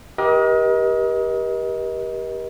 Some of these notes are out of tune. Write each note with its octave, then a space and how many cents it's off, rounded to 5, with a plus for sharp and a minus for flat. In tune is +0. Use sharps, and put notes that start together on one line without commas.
G4 +0 A#4 +40 D#5 +25